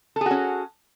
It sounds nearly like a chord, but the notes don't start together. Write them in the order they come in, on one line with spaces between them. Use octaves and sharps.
A4 G#4 F#4 C#4